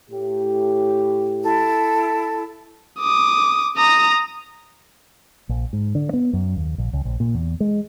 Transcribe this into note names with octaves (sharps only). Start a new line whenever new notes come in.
A2 G4
E4 A4
D6 D#6
A#5 D#6
A#1
G#2
D3
B3
F#2
D#2
A#1
C#2
A#1
A#2
E2
G#3